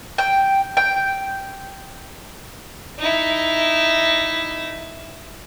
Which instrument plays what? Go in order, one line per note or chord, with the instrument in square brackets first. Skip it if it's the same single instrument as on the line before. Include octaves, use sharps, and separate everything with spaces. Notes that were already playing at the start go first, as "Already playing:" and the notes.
[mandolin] G5
G5
[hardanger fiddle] D#4 E4